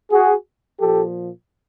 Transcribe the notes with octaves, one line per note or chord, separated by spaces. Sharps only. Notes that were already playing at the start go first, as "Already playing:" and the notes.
F#4 G#4
A#2 F3 G4 A4